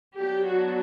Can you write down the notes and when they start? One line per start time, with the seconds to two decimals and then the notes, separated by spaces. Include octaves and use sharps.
0.18 F#3 B3 D4 G4
0.47 F#4